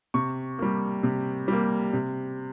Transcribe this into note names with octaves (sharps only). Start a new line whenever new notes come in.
C3 C#6
G3 A#3
C3
G3 A#3
C3